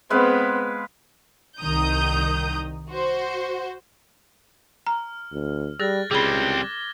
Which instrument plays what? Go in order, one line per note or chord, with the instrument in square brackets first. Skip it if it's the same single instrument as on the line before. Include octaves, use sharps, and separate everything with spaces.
[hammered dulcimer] G#3 B4 F5 [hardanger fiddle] B3 C4
[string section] C2 D#3 A#5 D#6 G6
F#4 C5
[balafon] A#5 [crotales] F6
[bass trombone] D2
[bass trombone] G3 [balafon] G#4 [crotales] F#6 A6 A#6
[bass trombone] C#2 [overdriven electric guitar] G3 C4 [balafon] G#4 B5 [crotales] D6 G#6 G7